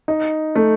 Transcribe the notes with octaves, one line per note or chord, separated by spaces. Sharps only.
D#4
A3